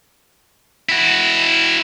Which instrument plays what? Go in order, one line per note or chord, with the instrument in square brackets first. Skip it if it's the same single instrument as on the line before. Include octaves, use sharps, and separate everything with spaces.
[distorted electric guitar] E4 F#4